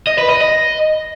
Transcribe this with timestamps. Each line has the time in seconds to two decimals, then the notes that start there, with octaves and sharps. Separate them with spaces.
0.07 D#5
0.18 B4
0.30 D#5
0.41 D#5